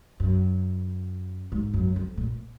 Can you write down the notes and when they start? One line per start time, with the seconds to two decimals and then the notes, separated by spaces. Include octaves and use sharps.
0.20 F#2
1.52 G#2
1.74 F#2
1.96 F2
2.17 A#2